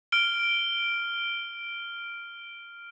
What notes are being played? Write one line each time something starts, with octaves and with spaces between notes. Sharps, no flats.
F6 D7 G7